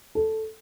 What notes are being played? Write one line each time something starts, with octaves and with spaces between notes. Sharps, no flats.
A4